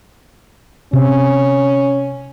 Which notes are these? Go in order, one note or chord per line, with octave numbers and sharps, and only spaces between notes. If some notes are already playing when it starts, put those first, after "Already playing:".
C3 C#4